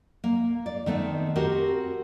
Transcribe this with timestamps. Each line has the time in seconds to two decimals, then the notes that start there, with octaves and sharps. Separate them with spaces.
0.24 A#3
0.66 D5
0.86 D#3 A3 B3 C4
1.36 C4 F#4 G4 A#4